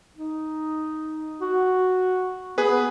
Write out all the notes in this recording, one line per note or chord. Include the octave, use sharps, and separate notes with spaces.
D#4
F#4
B3 G#4 B4